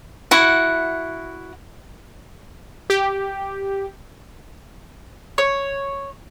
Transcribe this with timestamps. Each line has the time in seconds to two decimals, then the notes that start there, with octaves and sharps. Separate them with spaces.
0.31 E4 F#4 F#5
2.90 G4
5.38 C#5